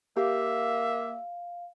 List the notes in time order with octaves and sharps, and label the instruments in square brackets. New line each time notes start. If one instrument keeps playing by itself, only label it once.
[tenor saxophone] A#3 [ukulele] G4 [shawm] E5 [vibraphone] F5